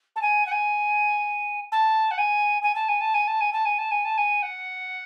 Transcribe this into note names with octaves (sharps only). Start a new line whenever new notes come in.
A5
G#5
F#5
G#5
A5
F#5
G#5
G#5
A5
G#5
A5
G#5
A5
G#5
A5
G#5
A5
G#5
A5
G#5
F#5